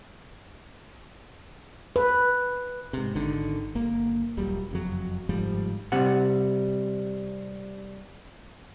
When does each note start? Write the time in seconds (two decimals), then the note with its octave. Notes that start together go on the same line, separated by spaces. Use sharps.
1.96 B4
2.93 G#2 C3
3.15 G#1 D3 D#3
3.75 G1 A#3
4.37 D#1 D#2 F#3 G3
4.71 F#1 F2 F#3
5.29 G1 G#2 F3 G3
5.92 C3 G3 F#5